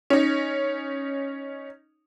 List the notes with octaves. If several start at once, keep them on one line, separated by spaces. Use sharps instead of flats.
C#4 D#4